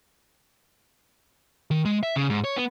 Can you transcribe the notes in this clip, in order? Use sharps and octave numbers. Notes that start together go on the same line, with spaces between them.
D#3
G#3
E5
C#3
G#2
C#5
B3